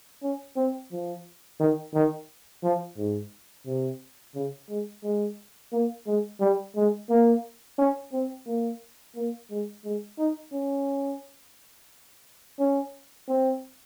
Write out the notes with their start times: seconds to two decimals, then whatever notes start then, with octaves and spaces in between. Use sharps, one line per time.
0.22 C#4
0.56 C4
0.92 F3
1.60 D#3
1.94 D#3
2.63 F3
2.97 G#2
3.66 C3
4.35 C#3
4.69 G#3
5.03 G#3
5.72 A#3
6.06 G#3
6.40 G3
6.76 G#3
7.10 A#3
7.78 C#4
8.13 C4
8.47 A#3
9.16 A#3
9.51 G#3
9.84 G#3
10.18 D#4
10.53 C#4
12.59 C#4
13.28 C4